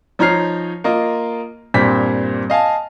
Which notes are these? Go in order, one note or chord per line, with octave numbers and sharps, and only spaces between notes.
F3 D#4 C#5 A#5 F6 C7
A#3 F4 D#5
G2 A#2 C4 B6
D#5 F5 G#5 A5